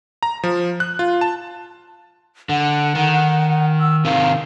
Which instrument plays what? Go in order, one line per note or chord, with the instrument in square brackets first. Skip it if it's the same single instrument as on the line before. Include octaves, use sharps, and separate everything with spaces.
[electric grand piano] A#5
F3
F#6
F4
A5
[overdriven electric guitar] D3 [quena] F#5
[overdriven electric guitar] D#3
[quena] E6
[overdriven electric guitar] C3 D#3 [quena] F5